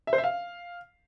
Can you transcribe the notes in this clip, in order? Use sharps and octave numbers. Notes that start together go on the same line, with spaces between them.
E5
C5
E5
F5